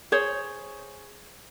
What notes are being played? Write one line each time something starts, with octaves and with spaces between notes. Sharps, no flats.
G#4 C5 C#5